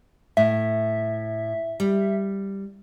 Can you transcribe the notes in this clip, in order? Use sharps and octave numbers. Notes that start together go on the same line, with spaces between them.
A2 E5
G3